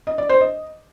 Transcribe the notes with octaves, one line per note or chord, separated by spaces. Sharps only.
D#5
D5
C5
D#5